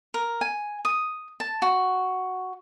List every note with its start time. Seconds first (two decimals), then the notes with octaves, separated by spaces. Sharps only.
0.14 A#4
0.41 G#5
0.85 D#6
1.40 A5
1.62 F#4